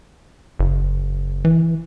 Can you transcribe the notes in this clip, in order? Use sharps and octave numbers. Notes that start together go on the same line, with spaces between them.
F#1
E3